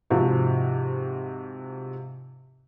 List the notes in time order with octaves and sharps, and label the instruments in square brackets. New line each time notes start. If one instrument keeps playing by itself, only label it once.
[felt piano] G#2 C3 F3 F#4